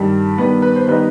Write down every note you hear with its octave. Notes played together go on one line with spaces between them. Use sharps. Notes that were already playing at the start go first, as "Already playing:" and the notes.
Already playing: G2 D#3 G3
G2 D#3 G3 B3 B4
B4
C5
D#3 G3 B3 D#4 B4